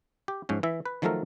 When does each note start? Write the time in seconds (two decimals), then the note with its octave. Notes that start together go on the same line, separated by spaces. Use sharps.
0.28 G4
0.49 G#2 F3 C#4
0.63 E3 E5
0.86 B4
1.02 D#3 F3 F#3 A3 A4 A#4